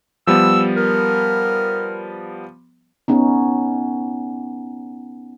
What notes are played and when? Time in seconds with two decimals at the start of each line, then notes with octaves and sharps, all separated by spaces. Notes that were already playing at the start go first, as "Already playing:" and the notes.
0.27 F3 G3 B3 E6
0.77 A#4
3.08 B3 C#4 D#4